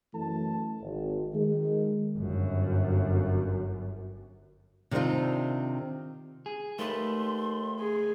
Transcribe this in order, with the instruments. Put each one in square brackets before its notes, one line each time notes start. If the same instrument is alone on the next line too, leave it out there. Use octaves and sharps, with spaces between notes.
[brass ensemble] F#2 E3 A3 A5
G#1
D#3 G#3
[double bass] G1 F#2
[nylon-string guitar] C3 D#3 C4 D4 D#4 F4
[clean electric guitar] G#4
[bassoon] D#2 [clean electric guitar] A3 B4 [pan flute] C6
[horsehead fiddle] G#4